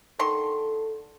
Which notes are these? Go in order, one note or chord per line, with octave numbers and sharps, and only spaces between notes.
D3 D#3 A4 C6